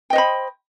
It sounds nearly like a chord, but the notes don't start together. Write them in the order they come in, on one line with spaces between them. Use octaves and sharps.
G5 D#5 C5 B5